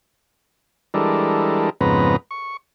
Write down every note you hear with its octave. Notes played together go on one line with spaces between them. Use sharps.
E3 G3 G#3 D4 A4 A#4
F2 G#2 C#3 B3 B4 A#5
C#6